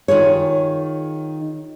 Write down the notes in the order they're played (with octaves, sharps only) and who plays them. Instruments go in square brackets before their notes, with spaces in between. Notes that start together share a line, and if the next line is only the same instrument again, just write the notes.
[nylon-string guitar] D#3 F4 G#4 C#5